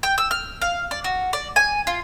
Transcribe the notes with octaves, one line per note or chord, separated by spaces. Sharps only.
G5
E6
F6
F5
D5
F#4
D5
G#5
F4